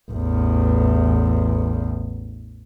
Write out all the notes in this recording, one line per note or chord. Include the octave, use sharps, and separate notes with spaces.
A1 E2